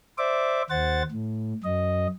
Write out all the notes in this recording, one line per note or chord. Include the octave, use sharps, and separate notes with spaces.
C5 D5 E5 D6
D#2 C5 F#5 A6
A2
F#2 D#5